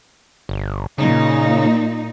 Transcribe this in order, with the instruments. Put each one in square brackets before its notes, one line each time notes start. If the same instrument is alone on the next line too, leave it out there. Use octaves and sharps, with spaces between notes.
[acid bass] G1
[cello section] A#2 D#4 [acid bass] C#3